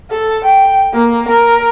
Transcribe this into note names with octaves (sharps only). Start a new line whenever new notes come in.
A4
G5
A#3
A#4